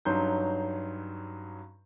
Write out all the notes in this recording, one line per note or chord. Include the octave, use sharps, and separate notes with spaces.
G2 F#3 C#4 D#4 C6 G6